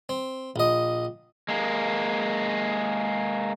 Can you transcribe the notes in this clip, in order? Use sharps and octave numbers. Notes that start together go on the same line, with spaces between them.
C4
A#1 D#5
G#3 A#3